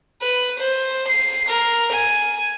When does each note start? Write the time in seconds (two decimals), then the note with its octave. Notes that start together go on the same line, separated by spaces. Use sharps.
0.22 B4
0.59 C5
1.08 C7
1.49 A#4
1.93 G#5